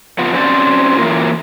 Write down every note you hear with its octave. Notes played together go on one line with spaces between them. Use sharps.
F2 B3 F4 F#5
F#3 C4 C#4 C5 D5
E3 F#3 A#3 F4